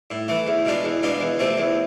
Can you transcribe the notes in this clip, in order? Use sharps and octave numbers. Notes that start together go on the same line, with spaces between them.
A2
E3 A3
E2
B2 G#3 D4 F4
E2
B2 G#3 D4 F4
E2
C3 F3 A3
E2